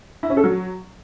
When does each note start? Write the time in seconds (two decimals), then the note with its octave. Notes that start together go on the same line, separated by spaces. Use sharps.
0.23 E4
0.30 C#4
0.37 A4
0.44 F#3